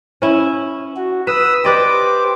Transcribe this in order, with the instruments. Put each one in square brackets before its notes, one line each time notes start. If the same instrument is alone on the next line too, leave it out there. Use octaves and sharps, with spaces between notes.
[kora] C#4 E4
[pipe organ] F#4
[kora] B4 [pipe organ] B5 D#6 E6
[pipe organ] G4 C5 D6 [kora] B4 D5 D#5